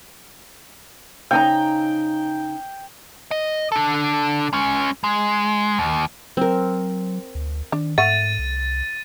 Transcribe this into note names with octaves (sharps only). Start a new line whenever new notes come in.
C#3 D#4 G5 A#5
D#5
D4 A4
G#3 C#4
G#3
D#2
F#3 C4 A#4
D2
D#3 D4
G#2 A3 E5 F#5 A6 D#7
C2